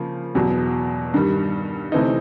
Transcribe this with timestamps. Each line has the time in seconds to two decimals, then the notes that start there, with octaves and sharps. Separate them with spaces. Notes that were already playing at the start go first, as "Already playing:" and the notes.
Already playing: C#3 F3 A#3
0.35 E2 B2 F#3
1.14 G2 D#3 G3
1.92 C3 E3 A3 C4 D#4